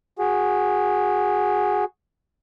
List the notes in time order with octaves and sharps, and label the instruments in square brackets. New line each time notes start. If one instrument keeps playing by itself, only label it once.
[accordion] F#4 G#4